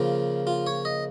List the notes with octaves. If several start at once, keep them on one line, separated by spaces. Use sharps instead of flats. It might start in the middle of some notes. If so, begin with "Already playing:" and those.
Already playing: C#3 F3 A#3 F4
F4
C#5
D#5